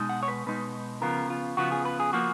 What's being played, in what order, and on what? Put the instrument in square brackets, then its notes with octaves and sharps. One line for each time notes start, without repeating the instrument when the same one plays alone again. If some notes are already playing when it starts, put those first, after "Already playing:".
Already playing: [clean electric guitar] B2 G#3 D#4
F#5
C#5
B4
B2 G#3 D#4 B4
C#3 F3 B3 F4 A#4
F4
C#3 F3 B3 F4 F#4
G#4
B4
G#4
F3 A#3 F4 F#4